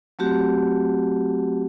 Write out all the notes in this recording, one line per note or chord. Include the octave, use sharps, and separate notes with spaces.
F#3 A3 C4 F#4 G4